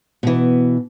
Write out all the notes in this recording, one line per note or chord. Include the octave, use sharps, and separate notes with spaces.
B2 E3